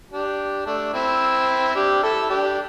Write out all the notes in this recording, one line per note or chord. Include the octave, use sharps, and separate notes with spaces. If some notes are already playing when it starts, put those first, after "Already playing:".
D4 G4
A3 D4
C4 E4
D4 G4
E4 A4
E4
D4 G4